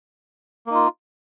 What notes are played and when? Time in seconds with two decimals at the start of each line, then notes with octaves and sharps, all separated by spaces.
0.67 A#3
0.71 D#4
0.75 F4